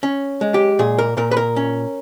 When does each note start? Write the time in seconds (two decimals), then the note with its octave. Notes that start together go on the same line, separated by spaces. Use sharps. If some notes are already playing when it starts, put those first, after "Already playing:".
0.03 C#4
0.41 G#3
0.54 G4
0.79 A#2 G#4
0.99 A#4
1.17 A#2 A#4
1.31 B4
1.37 A#4
1.56 C#4